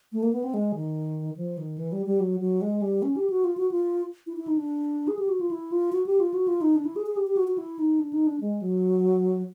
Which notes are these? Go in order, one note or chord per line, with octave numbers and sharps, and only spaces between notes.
A3
A#3
B3
C4
G#3
D#3
F3
D#3
E3
G3
G3
F#3
F#3
G#3
G3
C#4
G4
F#4
F4
F#4
F4
E4
E4
D#4
D4
G#4
G4
F#4
F4
E4
F4
F#4
G4
F4
F#4
F4
D#4
D4
E4
G#4
G#4
G4
G4
F#4
F#4
E4
D#4
D4
D#4
D4
G#3
F#3